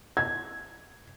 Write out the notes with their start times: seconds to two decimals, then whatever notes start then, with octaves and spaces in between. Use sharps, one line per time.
0.17 G#6